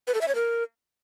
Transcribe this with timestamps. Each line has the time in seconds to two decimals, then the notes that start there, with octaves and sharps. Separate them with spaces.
0.07 B4
0.14 A4
0.21 E5
0.28 C#5
0.35 A#4